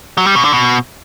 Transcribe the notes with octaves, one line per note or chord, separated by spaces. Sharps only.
F#3
G3
B2
D3
B2